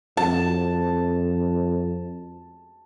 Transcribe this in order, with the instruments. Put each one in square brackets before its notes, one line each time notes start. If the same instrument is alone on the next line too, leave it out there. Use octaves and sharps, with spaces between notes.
[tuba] F2 [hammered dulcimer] A5